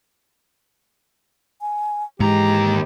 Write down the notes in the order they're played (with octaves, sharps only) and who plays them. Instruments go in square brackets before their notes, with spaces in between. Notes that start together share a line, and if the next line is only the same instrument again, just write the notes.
[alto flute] G#5
[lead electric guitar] D#2 A#5 [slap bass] G#2 E3 [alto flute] G#3 [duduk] G4